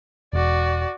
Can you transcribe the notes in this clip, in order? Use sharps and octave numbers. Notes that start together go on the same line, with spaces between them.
E1 F#4 D5